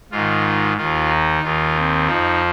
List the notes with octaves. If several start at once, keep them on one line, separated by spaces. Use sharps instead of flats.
G#2 D#3 F4
D#2 D#3 F4
D#4
D#2 D#3 F4
C4
F2 F3 D#4